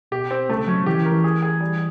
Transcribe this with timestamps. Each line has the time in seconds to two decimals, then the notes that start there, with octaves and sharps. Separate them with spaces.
0.11 B2 G4
0.31 C4
0.49 C#3 A3
0.67 F#3 C#4
0.82 F3
0.86 E3 G4
0.99 E3
1.06 A#4
1.12 E3
1.24 G#4
1.42 G#4
1.60 G3